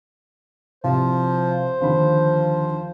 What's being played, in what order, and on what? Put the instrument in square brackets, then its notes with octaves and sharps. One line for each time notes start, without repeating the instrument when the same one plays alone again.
[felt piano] C2 [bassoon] F3 [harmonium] C5
[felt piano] D#2 D3 B5 [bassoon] F3